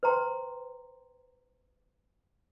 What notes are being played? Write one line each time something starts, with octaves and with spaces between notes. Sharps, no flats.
B4 C5 G5 A#5 C6